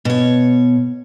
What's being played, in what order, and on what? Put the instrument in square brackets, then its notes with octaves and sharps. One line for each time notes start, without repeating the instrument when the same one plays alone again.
[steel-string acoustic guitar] B2 C#5